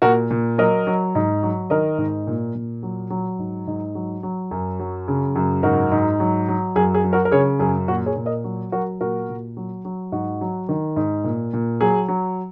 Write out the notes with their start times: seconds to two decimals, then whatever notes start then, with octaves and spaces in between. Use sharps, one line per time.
0.02 A#2 F#4 A#4
0.31 A#2
0.58 F#3 A#4 D#5
0.87 F#3
1.15 G#2
1.43 F#3
1.70 D#3 A#4 D#5
1.98 G#2
2.27 A#2
2.55 A#2
2.83 F#3
3.10 F#3
3.39 G#2
3.67 G#2
3.95 F#3
4.23 F#3
4.51 F#2
4.80 F#3
5.08 C#3
5.36 F#2
5.63 G#2 F#4 A#4
5.91 G#2
6.20 F#3
6.48 F#3
6.76 F#2 G#4
6.94 G#4
7.04 F#3
7.13 F#4 A#4
7.25 A#4
7.31 C#3 G#4 C#5
7.59 F#2 G#4
7.88 A#2 F#4 A#4
8.06 G#4 C#5
8.16 A#2
8.26 A#4 D#5
8.44 F#3
8.72 F#3 F#4 A#4
9.00 A#2 F#4 A#4
9.29 A#2
9.57 F#3
9.85 F#3
10.12 G#2 F#4
10.41 F#3
10.69 D#3
10.96 G#2
11.24 A#2
11.53 A#2
11.81 F#3 G#4
12.08 F#3